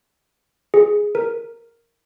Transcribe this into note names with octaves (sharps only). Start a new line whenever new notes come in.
G#4
A#4